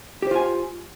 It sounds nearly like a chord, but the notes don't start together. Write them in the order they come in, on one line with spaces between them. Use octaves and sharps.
G4 C5 F4 G#5